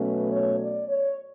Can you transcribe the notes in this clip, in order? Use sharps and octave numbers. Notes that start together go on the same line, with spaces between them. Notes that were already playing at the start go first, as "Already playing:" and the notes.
Already playing: B2 F#3 A3 C#4 B4
C#5
D5
C#5